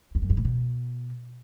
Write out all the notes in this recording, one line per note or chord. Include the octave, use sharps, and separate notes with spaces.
E2
F#2
G2
A2
B2